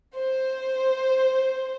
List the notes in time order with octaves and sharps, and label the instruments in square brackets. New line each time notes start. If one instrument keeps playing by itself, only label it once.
[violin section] C5